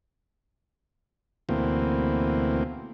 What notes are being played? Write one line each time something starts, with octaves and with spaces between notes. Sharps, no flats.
D2 B2 E3 A#3 C4